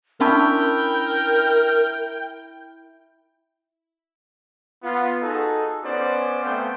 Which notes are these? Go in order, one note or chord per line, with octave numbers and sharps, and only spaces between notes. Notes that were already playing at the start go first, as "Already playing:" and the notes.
C#4 D4 E4 A#4 G5
B3 F4
D#4 F#4 G#4 A4
B3 C#4 C5 D5
A3 B3 C4 F5 G5